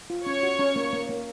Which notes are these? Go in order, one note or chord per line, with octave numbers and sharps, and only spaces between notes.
F4
C#4 C#5 C#6
F#4
C#4
A#3
A#3
A#3